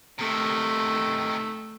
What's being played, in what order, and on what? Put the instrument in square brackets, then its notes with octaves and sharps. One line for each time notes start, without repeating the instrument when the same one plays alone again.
[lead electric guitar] C3 D#3 [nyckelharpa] A3 E5